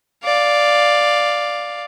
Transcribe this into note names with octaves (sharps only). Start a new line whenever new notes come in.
D5 F5